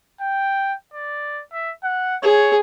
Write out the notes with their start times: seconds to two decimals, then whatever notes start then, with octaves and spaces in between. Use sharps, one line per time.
0.21 G5
0.93 D5
1.53 E5
1.84 F#5
2.23 G#4 C#5